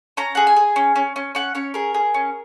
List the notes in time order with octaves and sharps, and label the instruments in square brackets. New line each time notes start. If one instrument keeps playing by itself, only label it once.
[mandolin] C#4 A#5
G#4 F#5
G#5
G#4
C#4
C#4
C#4
C#4 F#5
C#4 C#5
G#4 A#4
G#4
C#4